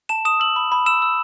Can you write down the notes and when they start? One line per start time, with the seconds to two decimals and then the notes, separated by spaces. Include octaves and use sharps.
0.09 A5 E7
0.25 D#6 E7
0.40 E6 F#7
0.56 B5
0.72 B5
0.86 E6 E7
1.02 E6